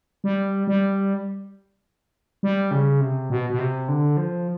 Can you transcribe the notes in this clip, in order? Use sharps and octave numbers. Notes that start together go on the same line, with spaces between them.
G3
G3
G3
C#3
C3
B2
B2
C3
D3
F3